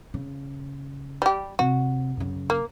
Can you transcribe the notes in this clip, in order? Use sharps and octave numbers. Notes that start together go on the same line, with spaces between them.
C#3
G3 G4
C3 F#4
F#2 C#3
A#3